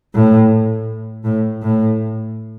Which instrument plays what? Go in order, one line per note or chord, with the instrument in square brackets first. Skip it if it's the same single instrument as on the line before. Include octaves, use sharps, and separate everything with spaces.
[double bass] A2
A2
A2